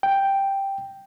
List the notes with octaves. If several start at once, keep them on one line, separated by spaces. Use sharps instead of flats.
G5